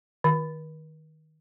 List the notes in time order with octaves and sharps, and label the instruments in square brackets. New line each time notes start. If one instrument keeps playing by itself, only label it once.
[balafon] D#3